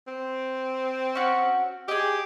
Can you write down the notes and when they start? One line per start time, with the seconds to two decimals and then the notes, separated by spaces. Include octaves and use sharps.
0.08 C4
1.15 C#4 F#4
1.88 G4 G#4 D#5